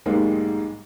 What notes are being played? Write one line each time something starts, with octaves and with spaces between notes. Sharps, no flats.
B1 G#2 D#3 G3 G#3 A#3